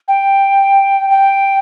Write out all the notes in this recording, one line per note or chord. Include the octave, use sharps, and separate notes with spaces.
G5
G5